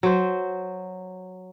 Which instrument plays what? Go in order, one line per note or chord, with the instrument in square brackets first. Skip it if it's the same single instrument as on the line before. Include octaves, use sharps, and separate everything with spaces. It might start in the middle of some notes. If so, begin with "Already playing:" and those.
[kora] F#3 C5